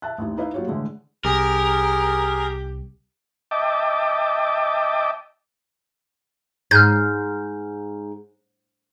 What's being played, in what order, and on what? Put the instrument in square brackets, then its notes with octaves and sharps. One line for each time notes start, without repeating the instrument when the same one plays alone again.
[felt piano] E5 A5 F#6
A1 D#2 D#4
D#4 E4 B4 D5 F5
F#3 A#3 F4 G4 C#5
A2 D3 E3 G#3
[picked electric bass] C2 [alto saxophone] G4 [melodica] G#4 [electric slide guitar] A#4
[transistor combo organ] D#5 E5 G5 A5 D6
[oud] G#2 [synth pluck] F6 G6